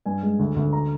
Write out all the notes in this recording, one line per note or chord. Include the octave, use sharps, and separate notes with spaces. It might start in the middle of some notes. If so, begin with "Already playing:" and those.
G2 G#5
G#3
D2
D2
A#5